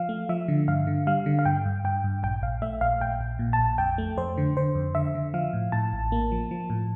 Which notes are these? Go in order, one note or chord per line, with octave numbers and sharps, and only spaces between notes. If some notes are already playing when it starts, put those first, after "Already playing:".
Already playing: F3 F5
A3
F3 E5
D3
G2 F5
D3
G3 F5
D3
F5
G2 G5
G2
G2 G5
G2
A#1 G5
A#1 F5
A3 E5
A#1 F5
A#1 G5
A#1
A#2
A5
A#1
F2 G5
A3
F2 C5
D3
D3 C5
F2
D3 E5
D3
F3 F5
A2
A2 A5
A1
A#3
F3
F3
A2